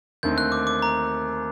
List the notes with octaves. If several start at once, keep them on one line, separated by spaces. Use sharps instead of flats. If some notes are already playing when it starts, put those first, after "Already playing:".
D#2 D3 A3 C4 D#4 G6
F#6
D6
D6
A#5